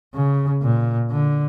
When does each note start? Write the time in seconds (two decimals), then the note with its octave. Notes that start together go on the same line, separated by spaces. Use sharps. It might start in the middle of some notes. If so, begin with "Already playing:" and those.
0.15 C#3
0.63 A#2
1.10 D3